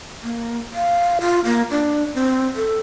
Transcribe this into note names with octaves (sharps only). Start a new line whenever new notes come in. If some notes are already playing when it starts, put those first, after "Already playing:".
A#3
F5
F4
A#3
D4
C4
A4